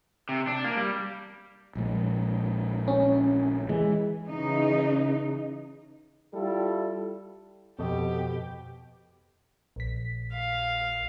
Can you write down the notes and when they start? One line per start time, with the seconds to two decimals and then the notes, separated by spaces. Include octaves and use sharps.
0.29 C3
0.47 D4
0.64 A#3
0.77 G3
1.75 A#1 G#3
2.88 C#4
3.69 E3 G#3
4.27 C#3 E3 D#4
6.34 G3 E4 F4 A4
7.79 F2 B2 B3 G4 A4 D#5
9.76 A#1 B6
10.33 F5